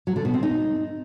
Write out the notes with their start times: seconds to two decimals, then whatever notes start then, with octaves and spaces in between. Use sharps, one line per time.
0.07 F#3
0.16 D3
0.25 B2
0.34 C4
0.43 D#4